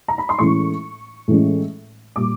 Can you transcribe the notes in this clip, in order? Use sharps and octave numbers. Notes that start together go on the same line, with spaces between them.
A#5
B5
C6
A2 E3 G#3 C#4 C#6
A2 E3 G#3 C#4
A#2 G3 D6